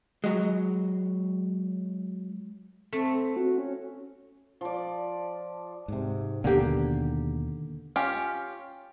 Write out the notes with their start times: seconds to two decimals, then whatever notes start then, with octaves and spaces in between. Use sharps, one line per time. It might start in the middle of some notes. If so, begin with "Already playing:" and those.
0.24 F#3 G#3
2.93 A3 C4
3.37 F#4
3.58 C#4
4.61 F3 D5
5.88 G#2 C3
6.44 D#2 B2 D3 A#3 G4
7.96 C#4 F4 G4